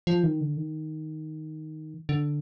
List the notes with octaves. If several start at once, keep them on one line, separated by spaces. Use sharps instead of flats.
F3
D#3
D3
D#3
D3